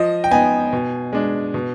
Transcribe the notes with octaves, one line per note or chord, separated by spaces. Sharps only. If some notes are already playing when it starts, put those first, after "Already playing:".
Already playing: F3 D#5
G5
B3 D#4 G#5
B2
G#3 D4
B2